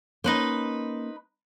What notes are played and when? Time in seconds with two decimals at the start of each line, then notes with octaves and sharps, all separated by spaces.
0.24 A#3 C#4 D#4 B4 C5